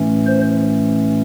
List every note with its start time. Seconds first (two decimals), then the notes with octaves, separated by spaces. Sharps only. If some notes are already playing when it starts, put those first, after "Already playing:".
Already playing: A2 E3 A3 C#4
0.27 C5